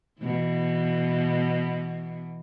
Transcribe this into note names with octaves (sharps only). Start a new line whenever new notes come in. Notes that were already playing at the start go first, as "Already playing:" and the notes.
B2 E3